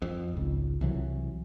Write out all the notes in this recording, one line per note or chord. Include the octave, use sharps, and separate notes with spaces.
F2
G#1 C#2
C2 E3 F#3